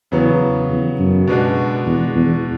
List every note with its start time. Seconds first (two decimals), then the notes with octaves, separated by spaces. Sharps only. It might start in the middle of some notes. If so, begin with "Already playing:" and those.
0.12 E2 C#3 F#3 B3
0.70 E2
0.99 F#2
1.27 B2 G#3 D4 F#4
1.85 E2
2.15 E2